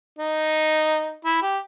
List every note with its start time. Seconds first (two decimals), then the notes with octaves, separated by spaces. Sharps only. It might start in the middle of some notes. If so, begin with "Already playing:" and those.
0.19 D#4
1.25 E4
1.42 G4